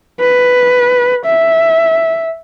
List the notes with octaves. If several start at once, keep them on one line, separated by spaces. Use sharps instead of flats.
B4
E5